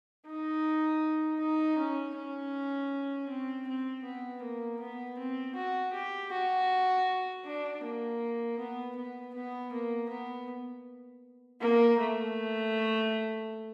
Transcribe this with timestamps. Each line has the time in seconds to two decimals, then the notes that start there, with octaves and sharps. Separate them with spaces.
0.27 D#4
1.40 D#4
1.78 C#4
2.15 C#4
3.29 C4
3.67 C4
4.04 B3
4.42 A#3
4.80 B3
5.18 C4
5.55 F#4
5.93 G4
6.32 F#4
7.45 D4
7.83 A#3
8.59 B3
8.96 B3
9.35 B3
9.72 A#3
10.09 B3
11.61 A#3
11.98 A3